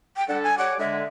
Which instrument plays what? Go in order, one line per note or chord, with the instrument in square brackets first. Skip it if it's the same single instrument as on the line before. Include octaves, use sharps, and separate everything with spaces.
[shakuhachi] G5
[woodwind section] D3 G3 A4 [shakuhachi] F#5
[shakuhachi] G#5
[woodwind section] G3 C#5 D6 [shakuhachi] F#5
[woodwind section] D3 G#3 [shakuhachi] E5